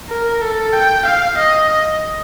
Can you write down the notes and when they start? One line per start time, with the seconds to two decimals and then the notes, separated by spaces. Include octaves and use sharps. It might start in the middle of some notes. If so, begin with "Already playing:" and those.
0.10 A#4
0.42 A4
0.73 G5
1.06 F5
1.38 D#5
1.70 D#5